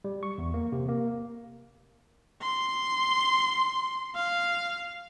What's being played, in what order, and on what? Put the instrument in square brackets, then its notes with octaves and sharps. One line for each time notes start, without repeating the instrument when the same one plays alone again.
[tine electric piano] G3
C#6
E2
A#3
C3
A#3
[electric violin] C6
F5